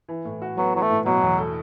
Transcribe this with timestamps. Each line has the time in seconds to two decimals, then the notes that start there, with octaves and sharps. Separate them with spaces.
0.09 E3
0.25 A2
0.42 F#4
0.57 F#3 B3
0.74 E3 F#3
0.82 A3
0.90 A2
1.06 B2 F#3
1.22 E2
1.38 A4